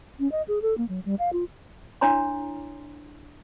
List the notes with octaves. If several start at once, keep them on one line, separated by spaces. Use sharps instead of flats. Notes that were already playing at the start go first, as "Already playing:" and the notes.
C#4
D#5
G#4
A4
A#3
F#3
G3
F5
F4
D4 E4 C#5 A#5 C6